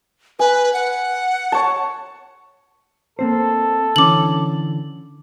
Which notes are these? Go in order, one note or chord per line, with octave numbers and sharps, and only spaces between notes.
B4 G#5
F#5
C#5 A5
A#3 C4 A4 C5
D3 E3 C#4 D6 F#7